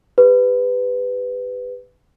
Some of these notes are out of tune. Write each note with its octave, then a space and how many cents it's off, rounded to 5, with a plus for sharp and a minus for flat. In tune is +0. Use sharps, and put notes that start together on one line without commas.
G4 +30 B4 +15